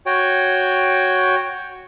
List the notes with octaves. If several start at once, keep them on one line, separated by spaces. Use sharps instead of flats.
F#4 C#5 G5